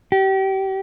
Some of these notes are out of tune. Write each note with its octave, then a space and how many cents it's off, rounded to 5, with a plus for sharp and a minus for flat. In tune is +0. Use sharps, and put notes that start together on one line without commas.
G4 -30